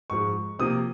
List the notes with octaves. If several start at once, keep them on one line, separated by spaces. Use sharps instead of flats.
G#2 F3 G#3 C#6
C3 F3 A#3 D#6